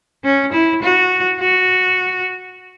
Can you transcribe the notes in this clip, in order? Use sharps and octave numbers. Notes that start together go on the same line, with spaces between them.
C#4
E4
F#4
F#4